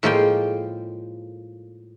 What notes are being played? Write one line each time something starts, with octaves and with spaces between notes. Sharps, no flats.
A2 F3 G#3 A#3 F5 G5